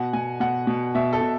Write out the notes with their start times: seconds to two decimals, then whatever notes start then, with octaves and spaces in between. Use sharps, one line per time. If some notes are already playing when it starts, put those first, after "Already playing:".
Already playing: B2 F#5
0.13 B2 G#5
0.40 B2 F#5
0.67 B2
0.95 B2 E5
1.13 A4
1.21 B2